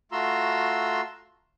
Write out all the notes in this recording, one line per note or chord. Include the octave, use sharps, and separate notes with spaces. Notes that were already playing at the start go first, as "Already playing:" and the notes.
A3 F4 F#4 A#5 C6 E6